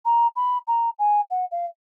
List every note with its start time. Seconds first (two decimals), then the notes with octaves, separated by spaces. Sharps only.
0.05 A#5
0.36 B5
0.67 A#5
0.99 G#5
1.31 F#5
1.51 F5